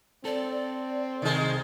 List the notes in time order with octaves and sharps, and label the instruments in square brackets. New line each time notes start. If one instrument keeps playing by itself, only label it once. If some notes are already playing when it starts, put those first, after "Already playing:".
[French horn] C4 [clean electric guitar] A4 [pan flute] D5
[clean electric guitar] C2 C3 [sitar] D#3 G#3